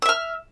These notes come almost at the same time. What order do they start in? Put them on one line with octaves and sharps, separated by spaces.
E6 E5 F6